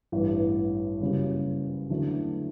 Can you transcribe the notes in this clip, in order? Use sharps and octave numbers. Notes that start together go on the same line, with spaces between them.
A1 G2 E3
F#1 F#2 C#3 G3
E2 D3 F#3 A3